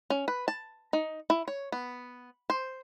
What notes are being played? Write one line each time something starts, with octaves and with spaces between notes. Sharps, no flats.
C#4
B4
A5
D#4
E4
C#5
B3
C5